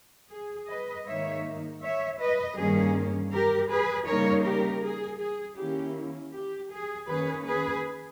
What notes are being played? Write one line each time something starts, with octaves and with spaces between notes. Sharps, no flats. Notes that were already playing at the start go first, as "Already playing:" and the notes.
G#4
B4 D#5
G#2 D#3 A#3 D#4 C#5 E5
C#5 E5
B4 D#5
G2 D#3 A#3 C#4 G#4
G4 A#4
G#4 B4
C#3 G3 A#3 D#4 A#4 C#5
G4 A#4
G#4
G#4
D#3 A#3 C#4 E4 G4
G4
G#4
D#3 A#3 C#4 G#4 B4
G#4 B4